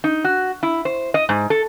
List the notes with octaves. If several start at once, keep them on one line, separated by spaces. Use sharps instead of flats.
D#4
F#4
E4
C5
D#5
G#2
A4